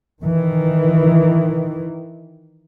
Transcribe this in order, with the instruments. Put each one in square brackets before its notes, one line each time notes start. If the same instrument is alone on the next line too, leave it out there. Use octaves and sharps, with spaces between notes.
[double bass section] D#3 E3